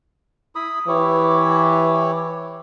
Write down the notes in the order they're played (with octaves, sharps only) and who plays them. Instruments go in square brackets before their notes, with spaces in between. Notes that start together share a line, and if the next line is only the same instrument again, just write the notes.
[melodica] E4 B5 D#6
[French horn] E3 [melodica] E4 G4 C#5